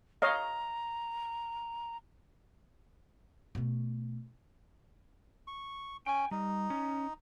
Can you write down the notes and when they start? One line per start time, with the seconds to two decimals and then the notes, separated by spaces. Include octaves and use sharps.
0.22 C#5 D#5 F5 A#5
3.55 B2 A3
5.47 C#6
6.06 C#4 G5 G#5
6.31 G3 D#4
6.70 C#4